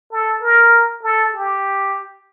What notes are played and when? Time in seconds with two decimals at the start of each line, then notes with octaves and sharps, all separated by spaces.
0.12 A4
0.42 A#4
1.03 A4
1.33 G4